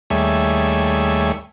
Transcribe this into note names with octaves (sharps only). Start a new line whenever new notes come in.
D#2 G3 A3 G#4 C#5 E5